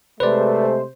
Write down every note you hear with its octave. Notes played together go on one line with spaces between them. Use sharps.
C3 G#3 A3 B4 C5 D5